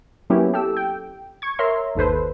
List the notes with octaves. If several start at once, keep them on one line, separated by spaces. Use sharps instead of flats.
F#3 A#3 B3 C#4 E4 G4
G4 A4 E6
G5
C#6 G#6
A#4 C#5 E5 A#5 C6
G1 D#2 A4 B4 C5